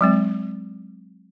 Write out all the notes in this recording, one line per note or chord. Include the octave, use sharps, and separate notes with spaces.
F#3 G#3 C4